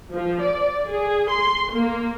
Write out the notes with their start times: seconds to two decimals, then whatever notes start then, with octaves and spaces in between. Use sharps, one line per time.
0.12 F3
0.42 D5
0.88 G#4
1.30 C6
1.73 A#3